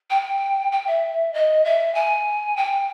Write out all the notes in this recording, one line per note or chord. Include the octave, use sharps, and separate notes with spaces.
G5
G5
E5
D#5
E5
G#5
G5